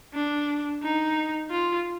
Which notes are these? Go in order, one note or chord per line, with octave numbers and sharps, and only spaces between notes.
D4
D#4
F4